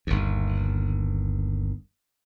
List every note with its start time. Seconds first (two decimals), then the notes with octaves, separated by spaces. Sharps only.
0.07 G1 D#2